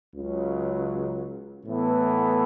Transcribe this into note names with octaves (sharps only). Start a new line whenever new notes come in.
C#2 C#3 F#3
A2 E3 B3 E4 A4